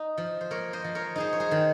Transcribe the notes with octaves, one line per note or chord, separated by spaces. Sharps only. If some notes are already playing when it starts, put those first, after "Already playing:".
Already playing: D#4
F3
C5
A#3 A#4 C#5
C5 D#5
F3
A#4 C#5
D#4 G#4 C5
C#5
G#4 C5
D#3